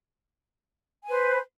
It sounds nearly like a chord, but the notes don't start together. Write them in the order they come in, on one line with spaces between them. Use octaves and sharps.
G#5 C5 B4